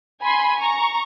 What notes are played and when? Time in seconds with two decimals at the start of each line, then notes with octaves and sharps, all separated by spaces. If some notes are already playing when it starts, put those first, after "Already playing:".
0.21 G#5 B5 C6
0.60 A#5 C#6